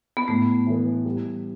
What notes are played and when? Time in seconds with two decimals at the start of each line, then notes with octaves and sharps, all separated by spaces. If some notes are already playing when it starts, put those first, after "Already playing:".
0.17 B3
0.28 A2 A3
0.67 E3 B3
1.05 G3